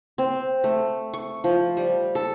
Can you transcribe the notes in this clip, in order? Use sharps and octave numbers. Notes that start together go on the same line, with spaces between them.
C4
A3
C#6
F3
G3
A4